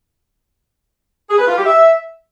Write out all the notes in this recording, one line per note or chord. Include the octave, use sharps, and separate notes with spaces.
G#4
B4
F4
G4
E5